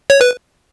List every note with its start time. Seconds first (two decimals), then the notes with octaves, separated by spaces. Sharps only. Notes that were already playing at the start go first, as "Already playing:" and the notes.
0.10 C#5
0.21 B4